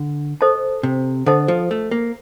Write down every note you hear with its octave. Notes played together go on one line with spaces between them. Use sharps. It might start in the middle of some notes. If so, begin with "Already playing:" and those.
Already playing: D3
A4 C5 D#5 A5
C3
D3 A4 C5 D#5 A5
F3
A3
A#3